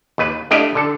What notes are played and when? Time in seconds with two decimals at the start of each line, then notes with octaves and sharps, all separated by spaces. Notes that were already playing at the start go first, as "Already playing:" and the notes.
0.18 D#2 B4
0.51 A3 D4 E4 G4 D#5 F5
0.75 D3 A4